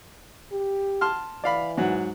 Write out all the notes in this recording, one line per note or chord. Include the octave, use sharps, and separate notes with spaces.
G4
A5 C6 F6
E3 D5 F5 B5
G#2 F#3 F#5